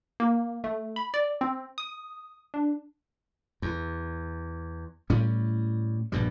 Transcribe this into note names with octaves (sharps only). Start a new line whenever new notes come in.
A#3
A3
B5
D5
C4
D#6
D4
E2
A2 G3 C#4
A#1 G2 B2 G3